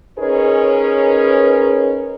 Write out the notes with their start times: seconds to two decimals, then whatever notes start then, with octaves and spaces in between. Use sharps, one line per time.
0.18 C#4 D#4 G#4 A#4 B4 C#5